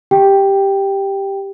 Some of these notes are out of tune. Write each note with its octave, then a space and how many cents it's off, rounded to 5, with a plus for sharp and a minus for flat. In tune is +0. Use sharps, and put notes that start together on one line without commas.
G4 +0 G5 +0